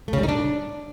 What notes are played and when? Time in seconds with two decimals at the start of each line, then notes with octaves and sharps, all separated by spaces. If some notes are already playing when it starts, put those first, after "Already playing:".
0.08 A3
0.13 C#3
0.18 G3
0.23 D#4
0.29 D4